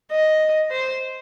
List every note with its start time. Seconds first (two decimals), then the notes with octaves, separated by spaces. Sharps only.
0.11 D#5
0.71 C5